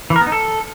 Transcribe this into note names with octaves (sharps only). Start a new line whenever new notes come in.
E3
A#4
B3
D#4
A4